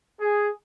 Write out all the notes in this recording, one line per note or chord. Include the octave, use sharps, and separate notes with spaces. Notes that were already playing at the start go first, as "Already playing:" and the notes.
G#4